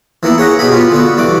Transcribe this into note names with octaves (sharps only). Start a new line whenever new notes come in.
E3 A#3 B3 E4
G#4 C#5 F#5 A#5
B2 G4 G#4 B5
B3 F4
D3 B3 F#4
G2 E3 F#4 D6